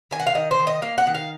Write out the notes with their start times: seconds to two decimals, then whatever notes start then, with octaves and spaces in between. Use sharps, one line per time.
0.11 D#3 G#5
0.20 F#5
0.27 F5
0.35 D#3 D#5
0.51 C5
0.59 D#3
0.67 D#5
0.82 A#3 F5
0.98 F#5
1.07 D#3
1.15 F5